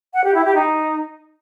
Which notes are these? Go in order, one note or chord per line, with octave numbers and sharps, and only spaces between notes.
F#5
G4
E4
G4
D#4